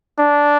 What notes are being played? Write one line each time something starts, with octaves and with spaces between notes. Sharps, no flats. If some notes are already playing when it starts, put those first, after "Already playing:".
D4